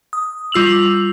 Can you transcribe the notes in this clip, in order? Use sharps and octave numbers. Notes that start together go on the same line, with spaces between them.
D#6
G3 F4 E6 F7 F#7